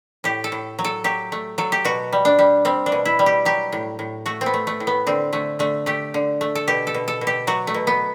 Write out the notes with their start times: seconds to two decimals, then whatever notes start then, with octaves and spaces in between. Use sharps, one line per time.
0.24 A2 G4
0.44 A4
0.52 A2
0.79 F#3
0.84 A4
1.04 F#3 G4
1.32 A3
1.58 F#3 A4
1.72 G4
1.85 B2 F#4
2.13 G3
2.25 D4
2.39 G3
2.65 G3 C4
2.86 D4
2.92 B2
3.05 E4
3.19 G3
3.26 G4
3.45 F#3 G4
3.72 A2
3.99 A2
4.26 A3 F#4
4.41 C4
4.46 B3
4.54 A3
4.67 A3
4.80 A2
4.87 B3
5.07 D3 C4
5.33 D3 A3
5.59 D3 A3
5.86 A3 G4
6.14 D3
6.41 A3
6.55 A4
6.67 B2 G4
6.87 A4
6.94 B2
7.08 A4
7.21 B2
7.27 G4
7.47 F#3 F#4
7.67 A3
7.74 B2
7.87 B3